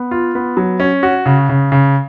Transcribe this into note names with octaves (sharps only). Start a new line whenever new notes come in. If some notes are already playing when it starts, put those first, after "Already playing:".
Already playing: B3
F4
B3
F#3
C#4
F#4
C#3
C#3
C#3